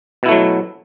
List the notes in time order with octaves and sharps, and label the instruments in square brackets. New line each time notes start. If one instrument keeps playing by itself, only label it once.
[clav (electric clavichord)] B2
E4
A3
F#3